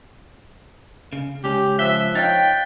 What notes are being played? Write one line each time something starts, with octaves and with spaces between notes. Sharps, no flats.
C#3
C#2 C#4 G4
F3 E5 F#6 B6 G7
D#4 C#5 F5 G5 A6